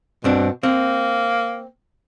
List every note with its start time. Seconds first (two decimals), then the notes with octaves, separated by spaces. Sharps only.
0.24 G2 B2 C4 D4
0.63 A#3 C4